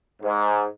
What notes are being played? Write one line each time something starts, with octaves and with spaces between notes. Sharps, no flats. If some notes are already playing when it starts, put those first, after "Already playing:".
G#2